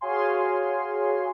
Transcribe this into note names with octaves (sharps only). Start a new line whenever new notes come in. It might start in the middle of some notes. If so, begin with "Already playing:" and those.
F#4 G#4 C#5 F5 G#5 C6